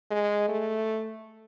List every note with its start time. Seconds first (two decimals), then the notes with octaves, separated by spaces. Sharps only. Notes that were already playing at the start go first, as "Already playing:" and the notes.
0.11 G#3
0.49 A3